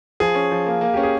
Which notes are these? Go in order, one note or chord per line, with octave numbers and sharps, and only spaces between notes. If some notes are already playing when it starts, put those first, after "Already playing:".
F3 G#4
C#4
F3
A#3
A#3
C#4 G4
G#4